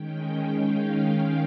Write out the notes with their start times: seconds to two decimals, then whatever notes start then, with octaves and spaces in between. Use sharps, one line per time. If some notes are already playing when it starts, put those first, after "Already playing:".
Already playing: D#3 G#3 C#4 G5
0.55 F5